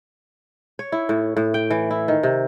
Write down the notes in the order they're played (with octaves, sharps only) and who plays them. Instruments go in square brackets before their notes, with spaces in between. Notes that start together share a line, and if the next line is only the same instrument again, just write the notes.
[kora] C#5
E4
A2
A2
G5
E3
E4
D#3
C3